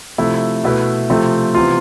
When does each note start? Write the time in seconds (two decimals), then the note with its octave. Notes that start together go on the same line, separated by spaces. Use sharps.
0.18 C3 F3 A3 E4
0.64 B2 A3 E4 B4
1.10 C3 F3 A3 C4 F4
1.55 C3 E3 B3 F4